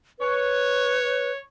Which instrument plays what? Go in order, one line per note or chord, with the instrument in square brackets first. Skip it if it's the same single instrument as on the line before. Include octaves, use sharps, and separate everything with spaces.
[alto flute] B4 [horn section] C#5